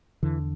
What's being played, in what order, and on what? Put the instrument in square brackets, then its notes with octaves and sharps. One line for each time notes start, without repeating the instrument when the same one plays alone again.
[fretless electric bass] E2 D3 E3